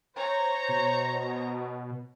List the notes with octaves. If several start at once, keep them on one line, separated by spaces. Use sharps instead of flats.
C5 C#5 A#5
B2